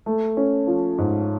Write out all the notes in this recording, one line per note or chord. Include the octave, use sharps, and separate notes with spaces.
A3
C#4
F3
G#2